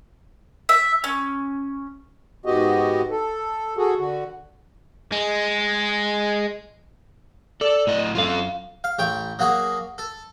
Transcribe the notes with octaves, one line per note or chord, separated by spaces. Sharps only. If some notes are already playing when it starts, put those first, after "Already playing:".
E5
C#4
G#2 B3 F#4 G4 D#5
A4
F#4 G#4 A4
D3 F#4
G#3
A4 D5
A2 D#5
F#2 F4 A4 F5
F5
A1 C#5 G5
F#3 A#3 F#4 G#4
A4